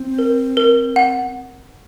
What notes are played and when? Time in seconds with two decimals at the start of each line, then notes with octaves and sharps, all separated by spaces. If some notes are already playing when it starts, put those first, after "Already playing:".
Already playing: C4
0.19 A#4
0.57 A#4
0.96 F#5